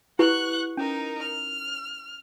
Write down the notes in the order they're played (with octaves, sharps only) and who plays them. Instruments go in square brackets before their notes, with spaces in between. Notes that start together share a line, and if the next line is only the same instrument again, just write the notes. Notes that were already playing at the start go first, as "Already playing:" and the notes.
[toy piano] E4 G4 B4 [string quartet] F#5 C#6 F#6
[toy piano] C#4 [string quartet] D#4 A#4
[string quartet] F6